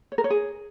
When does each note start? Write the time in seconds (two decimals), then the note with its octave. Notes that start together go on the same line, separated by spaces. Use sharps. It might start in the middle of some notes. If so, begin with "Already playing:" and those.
0.12 C#5
0.18 A#4
0.24 C#5
0.30 G#4